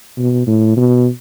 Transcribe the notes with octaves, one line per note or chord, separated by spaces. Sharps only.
B2
A2
B2